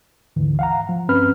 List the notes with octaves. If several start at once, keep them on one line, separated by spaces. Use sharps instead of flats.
D2 G#2 D3 E3
F5 F#5 A#5
F3
G2 C4 C#4 B4 B5 F6